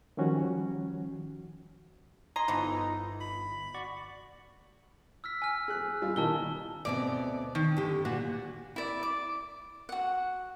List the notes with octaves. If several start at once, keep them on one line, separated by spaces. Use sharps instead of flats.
D#3 F3 G3 C#4 F#4
D#5 G#5 A#5 C6
G1 E3 F3 B3 D#4
B5
F#4 D5 C#6
E6 F6 B6
G#5 F6
G#4 F#6
G3 F4
A#2 D#3 E3 A5 E6 G7
D2 B2 C4 D5
D#3
D3 G4
A#2 F#4
E4 D5
D6
F#4 F#5